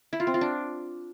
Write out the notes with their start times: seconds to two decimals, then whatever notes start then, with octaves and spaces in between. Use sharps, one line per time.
0.13 E4
0.20 F4
0.27 C4
0.34 F4
0.41 D4